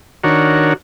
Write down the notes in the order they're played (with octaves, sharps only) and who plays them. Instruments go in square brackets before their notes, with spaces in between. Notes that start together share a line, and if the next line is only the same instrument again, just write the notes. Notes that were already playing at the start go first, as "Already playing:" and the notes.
[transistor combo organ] D#3 D4 F#4 A#4 C#5